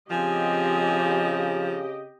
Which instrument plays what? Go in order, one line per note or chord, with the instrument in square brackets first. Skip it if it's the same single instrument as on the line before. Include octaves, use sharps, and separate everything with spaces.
[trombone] C#3 [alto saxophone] F3 [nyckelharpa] C4 G#5 [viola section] G4 D#5